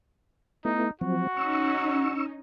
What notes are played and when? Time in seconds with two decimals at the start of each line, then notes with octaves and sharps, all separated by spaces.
0.65 A3 B3 D#4 E4
1.01 F3 F#3 C4 F#4
1.37 C#4 D#4 C#6 E6